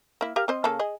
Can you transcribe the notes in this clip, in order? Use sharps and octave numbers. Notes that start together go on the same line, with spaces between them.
A#3 E4
G4 A#4 F5
C4 C5 D#5
C#3 A#3 A4
G#4 D#5